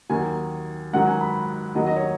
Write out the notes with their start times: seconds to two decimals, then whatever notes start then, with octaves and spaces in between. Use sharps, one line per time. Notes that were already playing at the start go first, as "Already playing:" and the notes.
0.09 D#2 D#3 F#3 G#5
0.93 G#2 D#3 F#3 F#5
1.07 G#5
1.21 B5
1.75 D#2 D#3 F#3 D#5
1.87 D#5
1.96 C#5